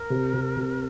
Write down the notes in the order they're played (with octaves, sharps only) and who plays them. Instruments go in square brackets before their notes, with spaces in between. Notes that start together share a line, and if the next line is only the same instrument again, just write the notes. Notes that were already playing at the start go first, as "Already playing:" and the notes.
Already playing: [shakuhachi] A#4
[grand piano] C3
C3
C3